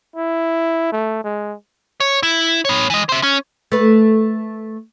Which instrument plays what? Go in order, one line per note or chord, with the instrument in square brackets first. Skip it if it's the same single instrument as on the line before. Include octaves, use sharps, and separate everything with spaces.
[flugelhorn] E4
A3
G#3
[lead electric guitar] C#5
E4
B3 C#5
E3 D#5
C5 E5
C#4
[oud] A3 B4